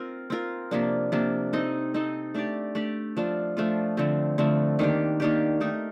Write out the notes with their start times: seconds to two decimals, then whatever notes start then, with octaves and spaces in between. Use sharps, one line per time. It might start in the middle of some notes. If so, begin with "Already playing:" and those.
Already playing: C4 F4 A#4
0.30 C4 F4 A#4
0.71 C3 F3 A#3 D4
1.12 C3 F3 A#3 D4
1.53 C4 D#4 A4 D#5
1.94 C4 D#4 A4 D#5
2.34 A3 D4 G4 D5
2.75 A3 D4 G4 D5
3.17 F3 A3 D4 F4
3.57 F3 A3 D4 F4
3.97 D3 F3 A3 C4
4.38 D3 F3 A3 C4
4.79 D#3 A#3 D4 G4
5.20 D#3 A#3 D4 G4
5.61 A3 D#4 A#4